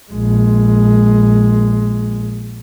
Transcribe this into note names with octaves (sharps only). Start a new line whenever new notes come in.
A#1 G#3